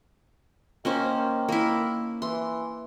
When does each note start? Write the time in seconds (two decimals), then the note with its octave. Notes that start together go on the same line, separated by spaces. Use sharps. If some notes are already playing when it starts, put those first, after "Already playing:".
0.85 D#3 A#3 C#4 C5
1.49 A#3 E4
2.22 E3 C6